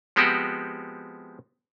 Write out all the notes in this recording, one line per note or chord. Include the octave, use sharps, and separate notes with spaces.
F3 G#3 B3 C4 F#4 G4